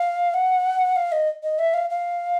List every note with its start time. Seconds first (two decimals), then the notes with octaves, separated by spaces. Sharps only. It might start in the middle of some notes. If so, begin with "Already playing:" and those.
Already playing: F5
0.34 F#5
0.96 F5
1.12 D#5
1.43 D#5
1.59 E5
1.74 F5
1.90 F5